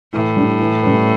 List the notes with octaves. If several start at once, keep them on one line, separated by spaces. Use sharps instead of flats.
A2 E3
G3 D4
E3
G3 C#4 E4 B4